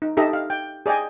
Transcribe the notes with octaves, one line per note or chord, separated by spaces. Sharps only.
D#4
D#4 G4 A4 D#5 E5 A#5
F5
G5
G#4 D5 D#5 G5 G#5